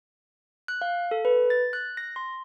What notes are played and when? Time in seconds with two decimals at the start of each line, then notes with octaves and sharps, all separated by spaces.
0.68 F#6
0.82 F5
1.11 A4
1.25 B4
1.50 A6
1.73 F#6
1.97 A#6
2.16 C6